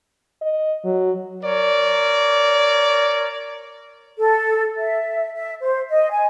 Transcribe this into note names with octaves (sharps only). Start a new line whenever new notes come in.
D#5
F#3
A#4 C#5 D5
A4
E5
E5
C5
D#5
G#5